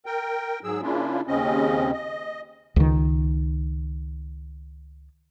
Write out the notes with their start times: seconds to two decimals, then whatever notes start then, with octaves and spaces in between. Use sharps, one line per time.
0.06 A#4 G5
0.64 G#2 F#3 G#4 E6
0.82 C#3 A#3 C#4 D4 E4 F4
1.27 D#2 C#3 C4 C#4 D#5
1.92 D#5
2.76 C#2 D#3